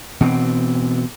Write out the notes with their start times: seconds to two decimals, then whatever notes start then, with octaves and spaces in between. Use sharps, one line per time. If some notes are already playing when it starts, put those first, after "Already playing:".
0.21 B2 E3 C4